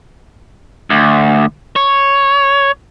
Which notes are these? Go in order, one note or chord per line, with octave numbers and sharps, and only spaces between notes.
D2
C#5